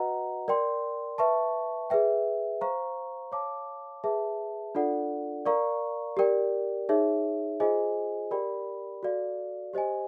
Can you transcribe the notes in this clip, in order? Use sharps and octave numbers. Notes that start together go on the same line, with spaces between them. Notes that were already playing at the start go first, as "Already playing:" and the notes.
Already playing: F#4 B4 D#5 F#5 A#5
A#4 D5 G5 C6
B4 E5 A5 C#6
G#4 B4 E5 G5
C5 F5 A#5 C#6
C#5 F5 A5 D6
G#4 B4 E5 A5
D4 F4 A4 D5 F#5
A#4 D5 F5 A#5 C#6
G4 A#4 D5 G5
D#4 G#4 C#5 E5
F4 G#4 C5 D#5 G#5
G4 A#4 D5 G5 B5
F#4 A4 D5 F5
G4 C5 D#5 G#5